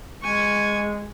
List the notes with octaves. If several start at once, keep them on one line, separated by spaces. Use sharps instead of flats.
G#3 G#5 C#6